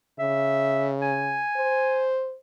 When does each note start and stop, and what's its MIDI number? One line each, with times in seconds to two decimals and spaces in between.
0.19 1.44 49
0.19 0.89 76
1.02 2.08 80
1.57 2.36 72